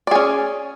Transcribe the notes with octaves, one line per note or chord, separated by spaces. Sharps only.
C#4 G#4 D5